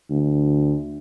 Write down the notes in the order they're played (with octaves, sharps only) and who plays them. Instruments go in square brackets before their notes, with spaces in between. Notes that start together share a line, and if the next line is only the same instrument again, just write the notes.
[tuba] D2